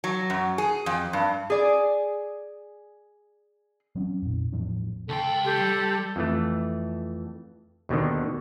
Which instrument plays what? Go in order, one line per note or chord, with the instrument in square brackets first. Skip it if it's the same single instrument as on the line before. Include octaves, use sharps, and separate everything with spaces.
[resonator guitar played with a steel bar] F#3
F#2
G#4
F2
G2
G#4 D5
[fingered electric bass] F#3 C4 C#4
F2 A#2
E2 A2 F3 D4
[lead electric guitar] C#2 G5 [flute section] A4 C6
[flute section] G4 A4 C6
[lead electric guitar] G3
[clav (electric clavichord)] F2 E3 A3
D#2 B2 D3 D#3